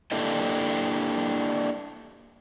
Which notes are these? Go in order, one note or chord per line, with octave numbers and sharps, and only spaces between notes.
A#3 D4 E4 G4 A4 D#5